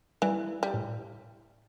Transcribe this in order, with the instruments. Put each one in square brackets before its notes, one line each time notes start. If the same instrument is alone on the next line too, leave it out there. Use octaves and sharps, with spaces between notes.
[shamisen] E3 [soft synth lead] G3
[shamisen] G3
[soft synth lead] A2